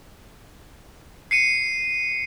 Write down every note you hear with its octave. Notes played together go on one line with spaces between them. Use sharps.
C7 C#7 D#7